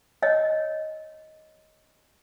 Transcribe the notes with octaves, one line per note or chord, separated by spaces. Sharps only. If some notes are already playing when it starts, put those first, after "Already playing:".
C#5 D#5